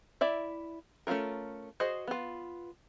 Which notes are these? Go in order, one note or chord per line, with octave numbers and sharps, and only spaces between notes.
E4 D5 E5
A3 C#4 D4 F4 A#4
F#4 G#4 C5 D#5
B3 F4